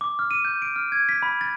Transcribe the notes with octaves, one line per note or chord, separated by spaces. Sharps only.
D6
F6
D#7
G6
D7
F6
G#6
B6
B5
A6